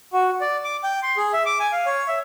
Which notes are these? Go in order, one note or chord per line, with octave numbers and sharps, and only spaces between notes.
F#4
D5
D6
G5
C6
G#4
E5
D6
G#5
F5
C#5
E5